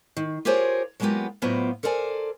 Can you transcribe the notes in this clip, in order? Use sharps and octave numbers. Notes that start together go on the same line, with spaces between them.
D#3
F4 G4 G#4 A#4 C5 C#5
F#3 G#3 A#3 B3 F4 G4
A2 F#3 B3 F4 C5 D5
A4 A#4 C5 D5 G#5